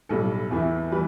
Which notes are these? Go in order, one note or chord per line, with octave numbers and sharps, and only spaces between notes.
B1 A2 G3 A4
E2 E3 B3 E4
E3 G3 B4